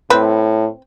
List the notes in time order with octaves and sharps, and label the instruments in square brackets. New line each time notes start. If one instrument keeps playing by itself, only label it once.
[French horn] A2 [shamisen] C4 B4